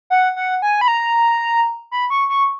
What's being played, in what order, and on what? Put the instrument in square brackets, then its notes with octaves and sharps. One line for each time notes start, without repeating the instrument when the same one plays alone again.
[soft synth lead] F#5
F#5
G#5
B5
A#5
B5
C#6
C#6